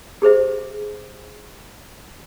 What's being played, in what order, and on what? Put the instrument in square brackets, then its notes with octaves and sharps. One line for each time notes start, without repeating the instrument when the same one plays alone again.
[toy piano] G4 G#4 C5 E5